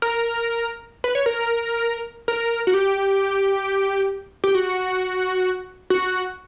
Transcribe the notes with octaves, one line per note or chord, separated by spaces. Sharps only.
A#4
B4
C#5
A#4
A#4
F#4
G4
G4
F#4
F#4